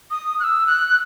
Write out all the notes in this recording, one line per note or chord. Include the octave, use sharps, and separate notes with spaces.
D#6
F#6
E6
F#6